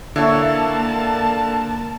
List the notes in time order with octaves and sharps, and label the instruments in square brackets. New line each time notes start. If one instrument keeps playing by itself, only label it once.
[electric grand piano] D3 [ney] A#3 [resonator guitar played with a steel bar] E4 C#5 [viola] A#4 A5